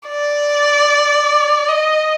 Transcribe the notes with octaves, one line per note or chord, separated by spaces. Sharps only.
D5
D#5